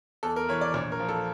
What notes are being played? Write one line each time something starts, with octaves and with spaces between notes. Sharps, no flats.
E2 A4
A#4
E3 C#5
D5
A#1 C#5
A#4
F3
A4